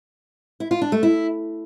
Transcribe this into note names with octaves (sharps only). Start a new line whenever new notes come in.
E4
F4
D4
A3
E4